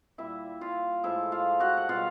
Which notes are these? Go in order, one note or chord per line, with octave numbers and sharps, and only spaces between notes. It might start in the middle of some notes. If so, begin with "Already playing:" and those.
A#2 G3 E4 E5
F4 F5
A2 F3 G#3 E4 E5
F4 F5
F#4 F#5
F#5
B2 G3 F4 F5